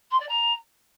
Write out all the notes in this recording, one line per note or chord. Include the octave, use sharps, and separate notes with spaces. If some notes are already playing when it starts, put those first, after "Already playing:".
C6
D5
A#5